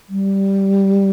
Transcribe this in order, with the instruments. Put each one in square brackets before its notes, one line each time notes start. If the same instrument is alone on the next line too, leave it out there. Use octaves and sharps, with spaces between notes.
[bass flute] G3